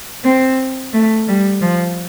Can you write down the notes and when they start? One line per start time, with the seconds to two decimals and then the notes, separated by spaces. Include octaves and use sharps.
0.24 C4
0.93 A3
1.28 G3
1.61 F3